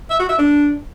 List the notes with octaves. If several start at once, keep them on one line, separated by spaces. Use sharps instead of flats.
E5
F#4
E5
D4